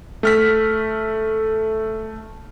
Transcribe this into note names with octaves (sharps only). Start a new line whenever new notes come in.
A3 F6 B6